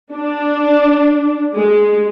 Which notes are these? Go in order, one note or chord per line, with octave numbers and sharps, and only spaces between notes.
D4
G#3